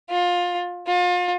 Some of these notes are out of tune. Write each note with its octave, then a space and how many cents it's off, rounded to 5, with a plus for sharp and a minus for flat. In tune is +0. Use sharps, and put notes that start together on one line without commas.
F4 +20
F4 +35